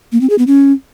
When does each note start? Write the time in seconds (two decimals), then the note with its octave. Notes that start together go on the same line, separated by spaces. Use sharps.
0.12 A#3
0.21 C4
0.30 G#4
0.38 B3
0.47 C#4